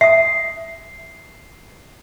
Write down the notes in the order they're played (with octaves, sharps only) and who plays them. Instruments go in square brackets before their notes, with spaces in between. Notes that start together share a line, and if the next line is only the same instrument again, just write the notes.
[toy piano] E5 A5 D#6 [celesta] C7